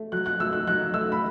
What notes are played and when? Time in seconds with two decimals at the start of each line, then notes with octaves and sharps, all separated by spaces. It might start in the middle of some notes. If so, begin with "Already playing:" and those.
Already playing: A3
0.12 F#3 F#6
0.26 F#6
0.40 A3 E6
0.53 F#6
0.67 F#3 F#6
0.94 A3 E6
1.12 B5